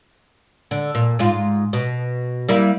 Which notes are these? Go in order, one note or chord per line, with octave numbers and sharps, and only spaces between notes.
D3
A#2
G#2 F4
B2
G3 A#3 E4